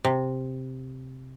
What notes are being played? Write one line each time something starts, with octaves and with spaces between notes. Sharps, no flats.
C3